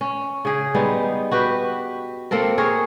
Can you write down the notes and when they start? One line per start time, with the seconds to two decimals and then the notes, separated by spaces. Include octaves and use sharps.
0.01 C#4
0.45 C#3 G#4
0.75 G3 G#3 B3 D#4
1.31 F#4 G4 B4
2.31 A#3 C4 A4 A#4
2.58 G#4 A#4 C#5